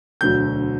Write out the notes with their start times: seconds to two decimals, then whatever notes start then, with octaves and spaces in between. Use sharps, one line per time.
0.21 E1 D2 D3 F#3 G6